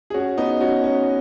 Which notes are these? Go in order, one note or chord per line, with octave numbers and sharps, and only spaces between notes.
G#4
C#4 F#4
B3 D#4
C#4 F#4
C#4